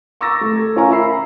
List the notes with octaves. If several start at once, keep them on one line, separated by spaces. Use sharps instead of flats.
A#5 C#6 D6 E6 A6 A#6
A3
A4 G#6
C#4 F4 A#4 G#5 A#5 C#6
E5 A#5 B5 E6 C7